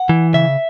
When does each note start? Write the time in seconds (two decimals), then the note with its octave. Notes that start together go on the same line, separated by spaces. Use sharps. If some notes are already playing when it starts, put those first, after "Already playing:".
Already playing: F#5
0.09 E3
0.34 C#3 E5